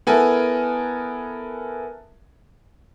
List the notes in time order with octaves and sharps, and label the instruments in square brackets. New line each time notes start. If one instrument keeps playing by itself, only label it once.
[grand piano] B3 E4 A4 A#4 G#5